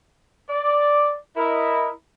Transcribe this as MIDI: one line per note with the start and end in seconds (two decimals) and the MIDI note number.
0.49 1.14 74
1.36 1.89 64
1.36 1.89 70
1.36 1.89 75